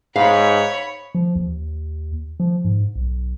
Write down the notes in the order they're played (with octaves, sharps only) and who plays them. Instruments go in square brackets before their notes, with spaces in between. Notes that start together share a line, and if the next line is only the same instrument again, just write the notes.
[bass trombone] G#2 [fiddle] C#5 B5 [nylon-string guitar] F5
[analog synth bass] F3
D#2
F3
G#2
B1